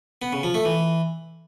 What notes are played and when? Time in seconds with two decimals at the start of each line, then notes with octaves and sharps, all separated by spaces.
0.22 B3
0.33 C#3
0.43 F3
0.54 A3
0.65 E3